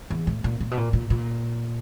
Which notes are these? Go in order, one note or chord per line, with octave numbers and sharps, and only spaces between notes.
E2
A2
A#2
A#2
B2
A#2
A#2
A#2